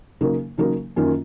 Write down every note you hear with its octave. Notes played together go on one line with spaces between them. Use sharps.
C#3 F#3 A#3 D#4 A#4
C#3 F#3 A#3 D#4 A#4
F#2 D#3 A#3 C#4 F4